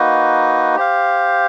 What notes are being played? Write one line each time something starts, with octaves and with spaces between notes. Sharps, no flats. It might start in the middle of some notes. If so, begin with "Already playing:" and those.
Already playing: A#3 D#4 F#4 B4 D#5
G4 C5 F5